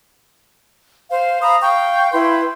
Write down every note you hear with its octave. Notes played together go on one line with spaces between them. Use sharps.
C5 F5
F5 A#5 B5 D#6
F5 G5 C#6
E4 B4 G5 C6